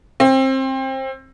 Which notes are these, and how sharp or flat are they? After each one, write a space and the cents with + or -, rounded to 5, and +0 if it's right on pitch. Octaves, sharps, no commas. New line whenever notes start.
C4 +25